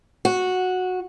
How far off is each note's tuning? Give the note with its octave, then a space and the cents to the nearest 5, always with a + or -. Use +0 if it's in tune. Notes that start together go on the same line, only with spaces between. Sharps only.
F#4 -10